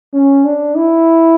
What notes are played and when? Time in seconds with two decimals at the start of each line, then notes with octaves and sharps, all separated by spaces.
0.13 C#4
0.45 D4
0.76 E4